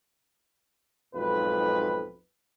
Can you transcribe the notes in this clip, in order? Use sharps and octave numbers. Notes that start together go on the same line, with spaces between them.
B1 F2 G#2 B4